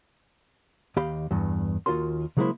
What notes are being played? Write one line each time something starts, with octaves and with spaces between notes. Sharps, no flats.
D#2 G4 D#5 F5 B5
E2 G2
D#2 F4 F#4 A#4 C6
C#3 F#3 G#3 A#3 E4 C5